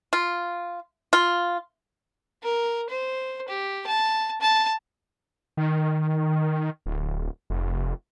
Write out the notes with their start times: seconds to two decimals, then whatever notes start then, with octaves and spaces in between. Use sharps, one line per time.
0.13 F4
1.13 F4
2.43 A#4
2.90 C5
3.48 G4
3.87 A5
4.41 A5
5.57 D#3
6.86 D1
7.50 F1